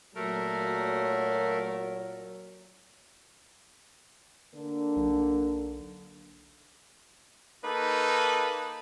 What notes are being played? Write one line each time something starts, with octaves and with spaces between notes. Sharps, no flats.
A#2 F#3 A3 A#4
D3 A#3 D4
B1
A#3 D#4 A4 B4